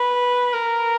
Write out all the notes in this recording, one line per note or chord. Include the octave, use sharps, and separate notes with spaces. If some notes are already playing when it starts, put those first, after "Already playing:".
Already playing: B4
A#4